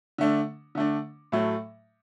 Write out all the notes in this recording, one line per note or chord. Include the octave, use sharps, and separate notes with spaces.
D3 A3 D4
D3 A3 D4
A2 F#3 A3